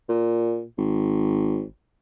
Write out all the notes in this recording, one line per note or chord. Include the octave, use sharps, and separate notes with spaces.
A#2
G#1